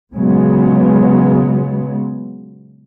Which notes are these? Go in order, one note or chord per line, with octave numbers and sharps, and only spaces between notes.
A#2 C#3 F#3 G#3 B3